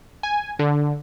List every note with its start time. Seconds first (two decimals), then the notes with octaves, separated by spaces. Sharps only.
0.23 G#5
0.59 D3